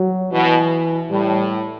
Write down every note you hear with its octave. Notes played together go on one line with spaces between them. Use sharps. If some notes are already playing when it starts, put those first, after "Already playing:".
Already playing: F#3
B2 E3
A2 G3